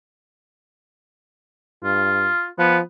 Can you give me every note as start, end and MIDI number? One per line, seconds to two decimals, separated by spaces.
1.84 2.30 43
1.84 2.47 65
2.59 2.81 53
2.59 2.77 59